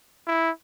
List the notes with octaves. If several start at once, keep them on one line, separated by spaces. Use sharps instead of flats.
E4